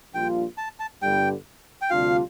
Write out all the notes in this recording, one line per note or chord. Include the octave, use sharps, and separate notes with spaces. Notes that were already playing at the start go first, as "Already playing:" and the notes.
A#1 A#2 G3 D4 F4 G5
A5
A5
G1 G2 D3 G3 G5
G5
D2 C3 G3 D4 F4 F5